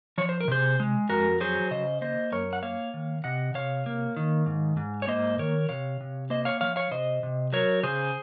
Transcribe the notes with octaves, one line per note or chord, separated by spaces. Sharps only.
F3 C#5
C5
A#4
C3 G#4 C5
G#3
F2 F#4 A#4
F#3 G#4 C5
C#3 C5 D#5
A#3 C5 D#5
F#2 A#4 C#5
F#5
A#3 C#5 F5
D#3
C3 D#5 F#5
C3 C#5 F5
A#3
D#3
G#2
G#2
C#5
A#3 C5 D#5
D#3 A#4 C#5
C3 C#5 F5
C3
A#3 C5 D#5
C#5 F5
F3 C#5 F5
C#5 F5
C3 C5 D#5
C3
F#3 A#4 C#5
C#3 G#4 C5